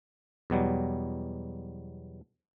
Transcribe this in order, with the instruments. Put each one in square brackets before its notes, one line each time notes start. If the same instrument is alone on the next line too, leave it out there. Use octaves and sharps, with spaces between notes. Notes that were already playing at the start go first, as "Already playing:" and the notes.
[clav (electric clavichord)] E2 B2 F#3 G3